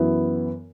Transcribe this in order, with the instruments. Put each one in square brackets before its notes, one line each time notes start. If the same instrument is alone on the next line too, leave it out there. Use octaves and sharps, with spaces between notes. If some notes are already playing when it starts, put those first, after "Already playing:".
Already playing: [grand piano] F#2 E3 B3 E4